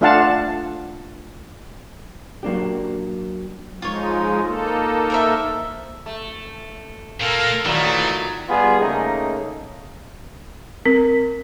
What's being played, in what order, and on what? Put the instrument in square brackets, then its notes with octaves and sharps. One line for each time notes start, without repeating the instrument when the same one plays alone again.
[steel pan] A3 D4 F4 F5 F#5 A5
[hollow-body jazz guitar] F#3 A#3 D4 G4
[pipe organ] F3 G#3 D#4 [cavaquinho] F4 C#5
[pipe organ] A#3 D#4 A4
[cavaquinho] A#4 C5 E5
[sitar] A3
[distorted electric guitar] A#2 A#3 [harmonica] A4 A#4 F5
[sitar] A#2 D#3 F#3 [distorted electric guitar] E3 [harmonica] A3
[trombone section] G3 B3 F4 G#4
C#3 A3 A#3 D#4
[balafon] C4 [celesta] A#4